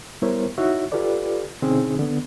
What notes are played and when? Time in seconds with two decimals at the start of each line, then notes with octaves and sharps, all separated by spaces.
0.22 G3 B3 E4 A#4 C5 C#5
0.58 D#4 E4 F#4 C#5 E5
0.92 F4 G4 A4 B4 D5
1.62 B2 D3 C4 C#4 D#4 G#4
1.99 D3 B3